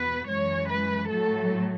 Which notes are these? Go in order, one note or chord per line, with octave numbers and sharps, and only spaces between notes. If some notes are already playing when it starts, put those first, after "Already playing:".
Already playing: E2 B2 B3 B4
F#2 E3 G#3 C#5
B4
A2 F#3 A3 A4